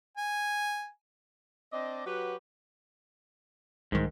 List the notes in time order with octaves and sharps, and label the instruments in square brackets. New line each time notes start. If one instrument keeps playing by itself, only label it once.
[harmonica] G#5
[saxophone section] C4 D4 D5 D#5
F#3 F#4 G4 B4
[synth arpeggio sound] C2 D#3 [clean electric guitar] G#2